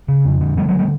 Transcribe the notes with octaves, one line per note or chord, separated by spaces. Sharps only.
C#3
F2
D3
D3 G3 A3
F#3 G#3
G3 A3